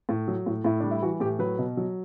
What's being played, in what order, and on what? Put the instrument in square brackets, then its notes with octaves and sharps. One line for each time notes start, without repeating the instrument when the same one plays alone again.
[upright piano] A2
F#3
A2
A2 E4
G3 D4
E4
E3 F#4
A2 G4
F#3 B4
B2
F#3